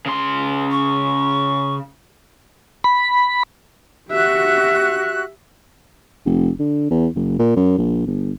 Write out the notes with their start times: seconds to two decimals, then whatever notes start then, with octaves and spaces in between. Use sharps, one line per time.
0.06 C#3 C6
0.71 C#6
2.84 B5
4.11 F#4 G4 E5 F#6
6.26 F1
6.59 D3
6.91 E2
7.15 F#1
7.39 A#2
7.56 F#2
7.78 A#1
8.07 G1